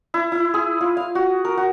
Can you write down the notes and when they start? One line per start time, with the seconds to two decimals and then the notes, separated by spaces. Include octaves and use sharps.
0.14 E4
0.32 E4
0.54 G#4
0.81 F4
0.97 F5
1.15 F#4
1.45 A#4
1.57 F#4